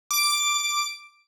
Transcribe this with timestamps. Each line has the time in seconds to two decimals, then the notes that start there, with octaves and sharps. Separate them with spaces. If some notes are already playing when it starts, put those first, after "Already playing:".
0.11 D6 D7